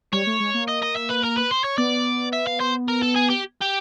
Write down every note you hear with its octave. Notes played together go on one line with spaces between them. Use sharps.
G3 C#5
A3
G#3
A#3
D#5
D#5
E5
B4
A#4
B4
C5
C#5
B3 D5
E5
F5
C5
A#4
A4
G#4
G4
G4